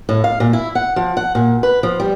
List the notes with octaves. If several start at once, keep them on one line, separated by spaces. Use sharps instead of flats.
A2
F5
A#2
E4
F#5
F3
F#5
A#2
B4
F3
G3